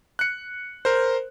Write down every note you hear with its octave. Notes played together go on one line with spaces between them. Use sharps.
F#6 C#7
A#4 C5